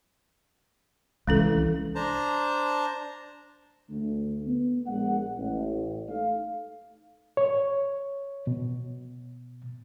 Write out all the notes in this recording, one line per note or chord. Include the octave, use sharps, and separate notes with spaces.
C2 E3 G#3 C#4 A4
D4 C5 A5 A#5
D2 D3 A3
B3
A#1 G#3 F#5
A1
A3 D#4 F5
C#5
B2